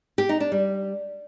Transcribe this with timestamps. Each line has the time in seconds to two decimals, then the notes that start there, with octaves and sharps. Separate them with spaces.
0.18 G4
0.29 D#4
0.40 D4
0.52 G3